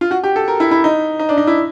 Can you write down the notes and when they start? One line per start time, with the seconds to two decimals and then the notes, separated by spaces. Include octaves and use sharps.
0.01 F4
0.11 F#4
0.24 G4
0.36 A4
0.48 A#4
0.60 E4
0.71 E4
0.84 D#4
1.19 D#4
1.29 D4
1.38 D#4
1.47 E4